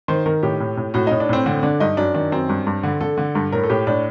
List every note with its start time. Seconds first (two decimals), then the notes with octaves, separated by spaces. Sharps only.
0.08 D#3 C5
0.26 D#3 A#4
0.43 A2 G4
0.60 A2
0.77 A2
0.94 A2 F#4
1.07 A2 D#4
1.20 D4
1.29 A2 C4
1.46 D3 C4
1.63 D3 D4
1.80 G2 D#4
1.97 F#2 D4
2.14 D#3 D4
2.32 F#2 C4
2.49 G2
2.67 G2
2.83 D3
3.01 D3 A4
3.18 D3
3.35 G2
3.52 A2 A#4
3.64 A4
3.70 A2 G4
3.87 A2 D4